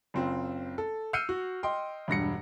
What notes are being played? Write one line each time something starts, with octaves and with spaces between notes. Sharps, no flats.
F#1 C4 F4
A4
E6 F6 G6 C7 C#7 D#7
F#4
D#5 G5 C6
E1 G2 A#6 C#7